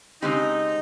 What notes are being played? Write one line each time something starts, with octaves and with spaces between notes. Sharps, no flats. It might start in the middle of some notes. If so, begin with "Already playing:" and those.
C#3 G#3 C4 D#4 G4